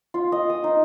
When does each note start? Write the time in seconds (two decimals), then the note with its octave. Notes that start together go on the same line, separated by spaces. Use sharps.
0.14 F4
0.32 D#5
0.50 D#6
0.64 D#4